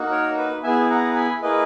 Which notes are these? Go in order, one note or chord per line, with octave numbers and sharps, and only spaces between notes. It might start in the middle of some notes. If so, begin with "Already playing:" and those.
Already playing: A#3 D#4 F#4
A#4 C#5
B4
B3 E4 G#4 E5 G#5
F#5 A#5
G#5 B5
A#3 E4 G#4 B4 D#5